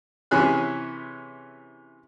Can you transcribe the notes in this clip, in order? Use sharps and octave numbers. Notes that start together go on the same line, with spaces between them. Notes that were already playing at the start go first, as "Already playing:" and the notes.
C3 E3 C#4 G#4 G#5 F#6